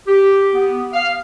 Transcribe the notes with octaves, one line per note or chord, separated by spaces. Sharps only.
G4
B3
F5